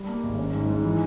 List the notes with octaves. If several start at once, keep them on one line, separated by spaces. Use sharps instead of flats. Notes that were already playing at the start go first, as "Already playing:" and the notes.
Already playing: G3
A#3
G#1
C#4
G#2
G#2
E3